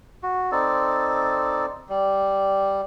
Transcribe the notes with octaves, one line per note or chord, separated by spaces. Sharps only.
F#4
C4 D#4 A4 D5
G3